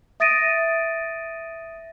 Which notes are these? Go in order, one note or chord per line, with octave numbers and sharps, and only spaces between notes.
E5 D#6 A6 A#6 D7 D#7